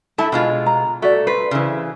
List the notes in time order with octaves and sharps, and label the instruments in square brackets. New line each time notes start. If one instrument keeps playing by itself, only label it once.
[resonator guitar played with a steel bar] A3 E4 [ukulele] A5 B5
[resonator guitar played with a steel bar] B2 G#3 F4
[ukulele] A#5
[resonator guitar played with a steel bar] A3 [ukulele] F#4 D5
[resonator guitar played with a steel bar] B4 [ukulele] C5
[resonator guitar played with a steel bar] C#3 E3